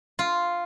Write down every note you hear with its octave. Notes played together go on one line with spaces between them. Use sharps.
F4